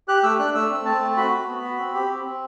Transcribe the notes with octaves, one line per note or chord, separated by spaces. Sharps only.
G4 F#6
A3 E6
D4 F#6
A3 E6
C4
C4 A5
A3
F#4 B5
F#4
B3
F#4
C4
G4
C4
C4